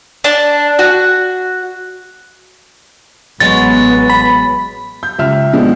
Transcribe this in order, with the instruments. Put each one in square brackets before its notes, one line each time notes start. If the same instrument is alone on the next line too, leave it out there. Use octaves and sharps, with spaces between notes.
[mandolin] D4
F#4
[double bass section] A1 B3 [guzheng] F#3 G#3 [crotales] A6
[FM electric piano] B5
[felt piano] G6
C#2 E5 F6
A#2 F3 G#3 B3 D4